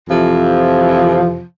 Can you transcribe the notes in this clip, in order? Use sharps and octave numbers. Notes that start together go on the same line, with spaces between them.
F2 C3 E3 F3